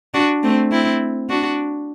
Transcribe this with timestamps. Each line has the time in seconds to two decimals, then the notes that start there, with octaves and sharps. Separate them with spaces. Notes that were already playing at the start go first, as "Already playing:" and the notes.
0.14 D4 F#4
0.43 A3 C4
0.71 C4 E4
1.29 D4 F#4